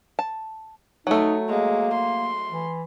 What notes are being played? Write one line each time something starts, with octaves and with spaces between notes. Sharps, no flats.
A5
F#3 A3 D#4
G#3 A#3
C6
E3